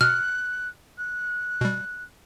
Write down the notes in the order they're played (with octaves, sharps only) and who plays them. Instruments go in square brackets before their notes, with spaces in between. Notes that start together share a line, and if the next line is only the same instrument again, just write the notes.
[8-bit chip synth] B2 [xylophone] F6 [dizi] F#6
[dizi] F#6
[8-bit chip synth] B2 G3